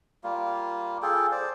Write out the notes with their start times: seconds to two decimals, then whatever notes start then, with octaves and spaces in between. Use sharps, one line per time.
0.24 G3 A#3 F4
1.02 F4 G#4 A4 G5
1.32 C5 D5